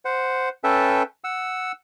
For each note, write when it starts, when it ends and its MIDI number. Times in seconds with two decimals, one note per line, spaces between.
0.05 0.49 72
0.05 0.49 78
0.64 1.03 61
0.64 1.03 69
0.64 1.03 71
0.64 1.03 76
0.64 1.03 79
0.64 1.03 81
1.24 1.72 78
1.24 1.72 88